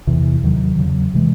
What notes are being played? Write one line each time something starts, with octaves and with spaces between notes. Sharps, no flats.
E2 C3 E3
D#2 D#3 F#3
E2 C#3 F#3
C3 E3 G#3